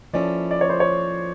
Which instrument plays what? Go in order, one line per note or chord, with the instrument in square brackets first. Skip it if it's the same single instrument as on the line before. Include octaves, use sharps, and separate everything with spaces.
[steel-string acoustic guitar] F3 A#3 C#4 E4 A4 [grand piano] D5
[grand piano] D5
C#5
C5
C#5